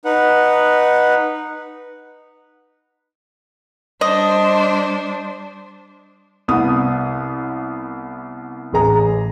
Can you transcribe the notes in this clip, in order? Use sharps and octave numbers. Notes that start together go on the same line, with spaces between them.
D#4 B4 F#5
G3 D4 C5 D#5
C2 B3 D#6
A1 G#4 A#5